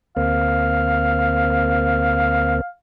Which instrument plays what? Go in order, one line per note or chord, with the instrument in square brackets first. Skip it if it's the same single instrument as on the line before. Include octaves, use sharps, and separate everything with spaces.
[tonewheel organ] D2 A#3 C4 [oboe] F5